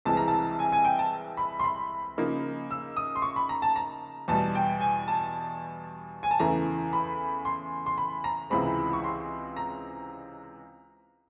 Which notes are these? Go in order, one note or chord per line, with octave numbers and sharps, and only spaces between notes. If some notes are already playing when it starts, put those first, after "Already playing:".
C2 C3 E3 G#3 A5
A#5
A5
G#5
G#5
G5
A5
B5
C6
B5
C#3 F3 A#3 D#4
E6
D#6
C6
C#6
B5
A#5
A5
A#5
E2 B2 G3 A5
G5
G#5
A5
G#5
A5
E2 C#3 E3 A3 A#5
B5
C6
C6
B5
A#5
C#2 C3 E3 G#3 C4 B5
C#6
C6
A#5